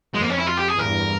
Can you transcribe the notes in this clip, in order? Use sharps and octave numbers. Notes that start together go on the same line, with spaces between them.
F2 G#3
A#3
C#4
E4
F4
G4
G#4
E2 G2 A#4